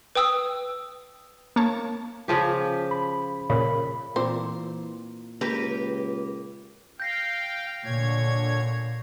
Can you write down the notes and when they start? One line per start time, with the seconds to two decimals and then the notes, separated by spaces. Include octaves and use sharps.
0.15 B4 G5 D#6 E6
1.56 A#3 C#5 A5
2.28 C#3 F3 G4
2.91 B5
3.50 A#2 C#3 B5
4.16 A#2 E3 C4 C5
5.41 C#2 A#3 G4 B4
7.00 F5 G5 G6 A#6 C7
7.84 A#2 D3 C#5 G#6